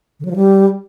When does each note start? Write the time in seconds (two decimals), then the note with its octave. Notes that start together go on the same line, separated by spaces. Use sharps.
0.20 D3
0.25 F#3
0.31 F3
0.36 G3